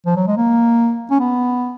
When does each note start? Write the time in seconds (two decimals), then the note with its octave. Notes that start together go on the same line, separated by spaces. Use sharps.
0.06 F3
0.16 F#3
0.27 G#3
0.37 A#3
1.11 C#4
1.20 B3